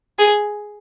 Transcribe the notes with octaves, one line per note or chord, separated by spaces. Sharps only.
G#4